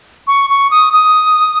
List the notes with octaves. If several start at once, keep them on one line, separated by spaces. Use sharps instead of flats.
C#6
C#6
D#6
D#6